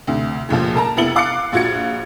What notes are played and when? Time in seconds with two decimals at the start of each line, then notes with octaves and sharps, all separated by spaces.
0.07 D2 C3
0.49 F1 C#2 A#2 F3
0.75 A#4 A5 A#5
0.97 F1 B3 E4 A6 C#7 F#7
1.16 F5 D6 F#6 A6 C7 C#7
1.52 A#1 F4 F#4 G#6 A6 C#7